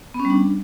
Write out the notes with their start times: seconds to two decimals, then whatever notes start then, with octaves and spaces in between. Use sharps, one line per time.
0.14 B3
0.20 C#4
0.25 G3
0.30 D4